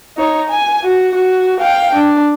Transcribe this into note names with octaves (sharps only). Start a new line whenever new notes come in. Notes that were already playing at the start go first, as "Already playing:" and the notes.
D#4 C#5
G#5
F#4
F#4
F5 G5
D4